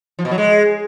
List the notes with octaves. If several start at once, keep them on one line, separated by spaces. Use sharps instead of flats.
F3
B2
F#3
G#3